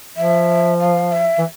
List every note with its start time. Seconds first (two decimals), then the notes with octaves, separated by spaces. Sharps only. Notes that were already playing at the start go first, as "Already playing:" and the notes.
0.17 F3 E5
0.80 F5
1.12 E5
1.38 E3